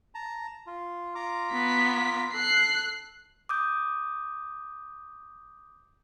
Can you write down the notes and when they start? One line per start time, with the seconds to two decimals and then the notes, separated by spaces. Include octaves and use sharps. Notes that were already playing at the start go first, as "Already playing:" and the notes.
0.15 A5 A#5
0.67 F4
1.15 F4 A#5 D6
1.53 B3 B6
2.34 A4 F#6 C7
3.49 D6 D#6 G6